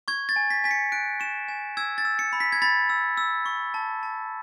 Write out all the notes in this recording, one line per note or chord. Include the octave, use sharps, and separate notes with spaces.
C#6 G#6
A6
G#5
B6
G#5 B6
C#7
F#6 D7
C#6 E7
G#5
E6 G#6
A6
E6
C#7
B5
B6
G#6
B5 A6
E6
E6
C#6
A5
A5